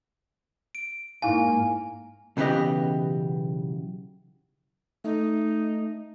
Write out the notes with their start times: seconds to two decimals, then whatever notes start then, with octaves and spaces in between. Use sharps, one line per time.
0.75 D7
1.22 G#2 A#3 D#4 E4 F5 G#5
2.37 B1 C#3 E3 B3 G4 D#5
5.04 A3 D#4